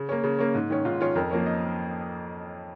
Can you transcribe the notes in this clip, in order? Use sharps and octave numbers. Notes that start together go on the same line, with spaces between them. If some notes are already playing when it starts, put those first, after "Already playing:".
Already playing: C#3
A#3 C#4
C#3
A#3 C#4
G#2
D#3 C#4
G#2 F4
D#3 C#4 F4
F2 A#4
F3 A#3 C#4
D#5